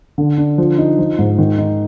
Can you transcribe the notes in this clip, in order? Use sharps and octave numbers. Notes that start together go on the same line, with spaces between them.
D3
D4
F3
D#4
F3
G#2
D#3
D#4